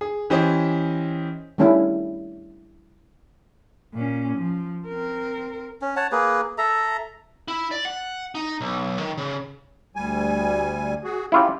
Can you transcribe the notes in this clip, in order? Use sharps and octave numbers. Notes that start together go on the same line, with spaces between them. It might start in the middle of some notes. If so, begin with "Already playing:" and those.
G#4
E3 C#4 G4 C5 D#5
D#3 G3 A3 C#4 D4 E4
A#2 C#4
F3
C4 A#4
C#4
C#5 F#5 A5
A#3 G#4 B4
A4 E5 A#5
E4
D5
F#5
D#4
B1
D#3
C#3
D2 G3 G#5
F#4 G#4
C#4 E4 F4 G4